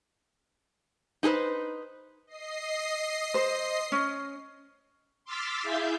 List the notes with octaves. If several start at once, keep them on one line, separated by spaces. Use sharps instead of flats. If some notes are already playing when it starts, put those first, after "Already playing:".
D#4 G4 G#4 B4 C5
D#5 C7
C5
C#4
C6 D6 E6 F6 A6 B6
E4 G#4 E5 F5 G6